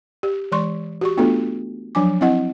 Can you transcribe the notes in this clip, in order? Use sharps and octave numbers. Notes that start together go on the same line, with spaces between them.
G4
E3 G#3 D5 C6 C#6
F#4 G4 C#6
A3 B3 D4 F4 F#4 A4
F3 F#3 D4 G#5 D6
C4 E4 D#5 F#5